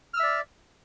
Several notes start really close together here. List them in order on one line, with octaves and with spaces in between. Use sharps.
F6 E6 E5 D5